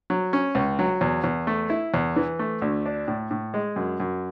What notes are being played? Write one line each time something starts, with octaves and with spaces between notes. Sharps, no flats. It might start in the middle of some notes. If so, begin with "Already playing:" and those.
F#3
C#4
C#2
F#3
E2
E2
A3
E4
E2
E3
A3
D2
D4
A2
A2
G#3
F#2
F#2